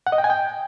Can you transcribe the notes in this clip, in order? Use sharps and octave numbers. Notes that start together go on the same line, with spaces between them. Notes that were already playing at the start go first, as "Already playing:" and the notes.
F#5
D#5
G5
G#5
G5